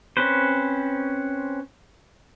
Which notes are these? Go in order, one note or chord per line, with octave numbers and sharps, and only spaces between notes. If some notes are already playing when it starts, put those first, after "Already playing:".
C4 C#4 B4 C5